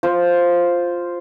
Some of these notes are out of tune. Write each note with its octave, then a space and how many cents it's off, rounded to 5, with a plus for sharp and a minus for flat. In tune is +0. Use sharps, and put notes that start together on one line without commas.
F4 +0 C5 +0